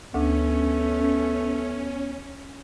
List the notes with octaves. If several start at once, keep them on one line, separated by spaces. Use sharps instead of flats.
D2 A3 B3 C#4 D4